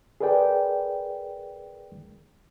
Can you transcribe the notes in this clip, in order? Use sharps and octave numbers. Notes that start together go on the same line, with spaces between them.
G#4 A#4 B4 D5 G5